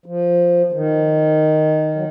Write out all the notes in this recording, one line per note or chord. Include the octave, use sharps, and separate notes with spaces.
F3
F3
D#3
F#3